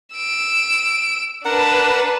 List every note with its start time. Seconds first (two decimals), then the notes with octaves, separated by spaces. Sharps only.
0.14 E6 D7
1.45 D4 A#4 B4 F#5 A5